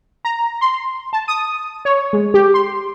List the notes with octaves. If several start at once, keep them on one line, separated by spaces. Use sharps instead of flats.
A#5
C6
A5
D#6
C#5
G#3
G4
C6